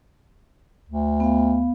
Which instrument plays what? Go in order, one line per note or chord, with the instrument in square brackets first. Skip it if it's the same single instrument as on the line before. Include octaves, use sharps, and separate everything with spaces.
[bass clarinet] D2
[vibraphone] B3 F5